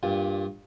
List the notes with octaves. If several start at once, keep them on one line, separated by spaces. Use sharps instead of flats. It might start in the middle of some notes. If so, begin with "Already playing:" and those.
G2 A#2